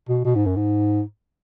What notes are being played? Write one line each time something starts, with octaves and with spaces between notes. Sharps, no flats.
B2
B2
G#2
F#2
G#2